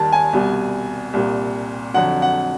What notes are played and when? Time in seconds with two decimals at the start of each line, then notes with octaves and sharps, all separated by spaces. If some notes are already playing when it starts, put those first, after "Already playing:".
Already playing: D#2 D#3 G3 A5
0.13 G#5
0.33 C2 B2 G3
1.13 C2 A#2 G3
1.94 F2 D3 F#3 F#5
2.22 F#5